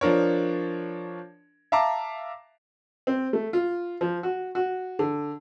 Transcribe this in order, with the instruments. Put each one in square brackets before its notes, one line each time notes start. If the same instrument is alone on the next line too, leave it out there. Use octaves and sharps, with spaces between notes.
[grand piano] F3 D4 A#4 C#5
E5 F5 A5 A#5 D6
[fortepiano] C4
A3
F4
F3
F#4
F#4
D3